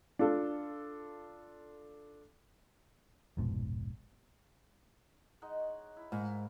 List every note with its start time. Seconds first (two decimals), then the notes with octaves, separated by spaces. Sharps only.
0.19 D4 F4 A4
3.37 F1 A#1 G#2 B2
5.42 G#3 D#4 F#5
5.60 C#5
5.97 E4
6.12 G#2 E4 A#4 F5